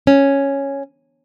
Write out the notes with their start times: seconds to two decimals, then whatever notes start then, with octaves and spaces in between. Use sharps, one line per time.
0.07 C#4